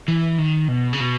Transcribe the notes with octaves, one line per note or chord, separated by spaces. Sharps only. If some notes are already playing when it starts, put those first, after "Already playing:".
E3
D#3
B2
C#3
B2